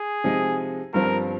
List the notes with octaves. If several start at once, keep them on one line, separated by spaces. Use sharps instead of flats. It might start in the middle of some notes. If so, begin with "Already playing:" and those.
Already playing: G#4
C3 F3 G#3 D#4
G1 G2 F3 C4 A#4